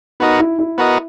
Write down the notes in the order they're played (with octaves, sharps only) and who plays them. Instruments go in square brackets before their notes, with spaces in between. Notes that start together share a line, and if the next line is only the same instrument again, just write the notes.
[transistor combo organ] B3 F#4 A#4 D#5 [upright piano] D#4
[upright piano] E4
E4
[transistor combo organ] B3 F#4 A#4 D#5